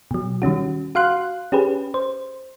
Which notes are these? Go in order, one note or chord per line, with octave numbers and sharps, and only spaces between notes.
B2 F#3
D#3 G3 C#4 F#4
F#4 F5 C6 F#6
C#4 G4 G#4 B4
C5